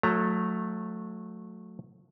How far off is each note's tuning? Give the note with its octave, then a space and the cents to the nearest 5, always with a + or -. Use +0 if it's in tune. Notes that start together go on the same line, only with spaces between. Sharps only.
F#3 -25 A3 +0 A#5 +0